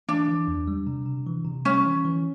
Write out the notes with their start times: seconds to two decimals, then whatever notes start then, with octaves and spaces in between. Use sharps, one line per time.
0.09 E3 D4
0.28 E3
0.48 E2
0.67 G3
0.87 C3
1.06 C3
1.26 E3
1.45 C3
1.65 G3 C#4
1.85 E3
2.05 E3